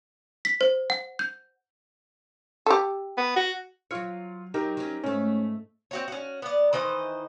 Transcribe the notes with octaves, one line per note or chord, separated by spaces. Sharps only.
B6
C5
F#5
G6
G4 A4
B3
F#4
F#3 F4 C#5 F6 C#7
F#3 D#4 G4 A#4
F#3 C#4
G#2 A3 C#4
C4 F#4 C#5
C#4 F#4
B3 D5
D#3 E3 C5 D#5